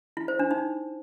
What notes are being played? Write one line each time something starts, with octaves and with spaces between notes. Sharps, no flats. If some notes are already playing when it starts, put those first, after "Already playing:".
E4
C5
D4
D#4